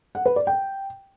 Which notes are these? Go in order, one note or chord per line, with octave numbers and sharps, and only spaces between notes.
F#5
B4
D5
G5